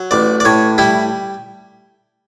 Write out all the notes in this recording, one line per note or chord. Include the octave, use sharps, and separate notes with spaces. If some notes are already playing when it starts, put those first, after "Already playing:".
Already playing: F#3
A1 D5
D5
A2 C#5
G3 E4